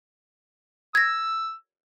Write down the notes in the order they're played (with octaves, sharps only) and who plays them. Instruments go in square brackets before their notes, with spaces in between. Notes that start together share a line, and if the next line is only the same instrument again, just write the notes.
[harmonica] E6 [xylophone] G#6 A#6